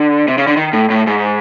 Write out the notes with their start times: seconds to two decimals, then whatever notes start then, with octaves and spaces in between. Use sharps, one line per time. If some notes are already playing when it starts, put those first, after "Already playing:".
Already playing: D3
0.28 C3
0.38 C#3
0.47 D3
0.57 D#3
0.73 A2
0.90 A2
1.07 G#2